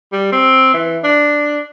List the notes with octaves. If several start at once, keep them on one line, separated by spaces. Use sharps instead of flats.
G3
C4
E3
D4